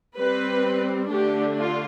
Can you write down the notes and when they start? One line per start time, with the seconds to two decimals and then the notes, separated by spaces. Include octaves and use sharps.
0.17 G3 C4 B4
1.10 D3 A3 D4 G4
1.57 F4